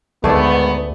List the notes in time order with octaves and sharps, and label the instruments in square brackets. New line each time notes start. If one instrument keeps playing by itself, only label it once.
[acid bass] D2 [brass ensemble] G#2 D#3 B3 [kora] A3 G#4 D5